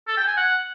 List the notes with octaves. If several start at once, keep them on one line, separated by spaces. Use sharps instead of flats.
A4
G5
G#5
F#5